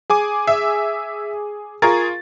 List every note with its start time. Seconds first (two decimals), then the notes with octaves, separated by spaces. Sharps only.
0.10 G#4 G#5 D6
0.47 E5
1.82 F4 G#4 A#4 C#6 A6